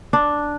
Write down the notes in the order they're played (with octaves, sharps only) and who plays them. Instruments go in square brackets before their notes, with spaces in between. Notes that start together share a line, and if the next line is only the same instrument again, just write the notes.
[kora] D4